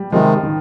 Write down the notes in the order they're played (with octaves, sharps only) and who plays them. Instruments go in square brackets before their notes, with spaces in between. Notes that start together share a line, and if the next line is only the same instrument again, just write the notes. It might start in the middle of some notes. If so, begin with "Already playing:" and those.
Already playing: [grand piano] G3
[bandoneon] C3 D#3 G#3 [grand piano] F3
[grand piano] D#3